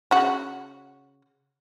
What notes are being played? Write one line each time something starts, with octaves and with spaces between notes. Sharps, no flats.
C#3 F#4